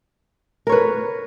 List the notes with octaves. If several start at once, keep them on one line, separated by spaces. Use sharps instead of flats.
A#4 B4 C#5